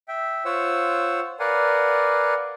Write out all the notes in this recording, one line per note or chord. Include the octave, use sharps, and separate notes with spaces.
E5 G5
F4 C5 C#5 F#5 E6
A#4 B4 D5 F5 F#5 G#5